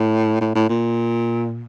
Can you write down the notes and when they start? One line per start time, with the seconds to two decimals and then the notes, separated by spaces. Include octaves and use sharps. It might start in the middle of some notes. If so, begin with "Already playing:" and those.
Already playing: A2
0.41 A2
0.55 A2
0.69 A#2